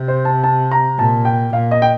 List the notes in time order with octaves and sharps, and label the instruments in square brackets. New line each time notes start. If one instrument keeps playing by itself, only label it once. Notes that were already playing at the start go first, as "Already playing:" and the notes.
Already playing: [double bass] C3
[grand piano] C5
A5
A5
A#5
[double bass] A#2 [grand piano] A5
[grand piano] G5
[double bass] A#2 [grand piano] F5
[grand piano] D#5
G5